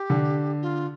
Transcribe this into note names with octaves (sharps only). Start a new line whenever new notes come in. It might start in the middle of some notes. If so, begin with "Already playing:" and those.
Already playing: G4
D3
F4